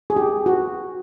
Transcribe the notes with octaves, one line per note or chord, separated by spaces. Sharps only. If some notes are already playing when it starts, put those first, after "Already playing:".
G#4
G4
F#4